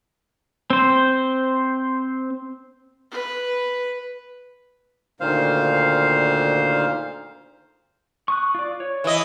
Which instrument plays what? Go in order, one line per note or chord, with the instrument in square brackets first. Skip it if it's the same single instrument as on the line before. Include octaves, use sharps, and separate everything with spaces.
[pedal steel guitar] C4 C5
[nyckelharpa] B4
[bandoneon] D2 A#2 D#3 C5 F5
[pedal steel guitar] C#6 D#6 F#6
F4 D5
C#5
[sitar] E3 D#5